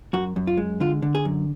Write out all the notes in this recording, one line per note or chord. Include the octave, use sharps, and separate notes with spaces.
F#2 F#4
F#2
F4
G#3
D3 F4
D3
G#4
F#2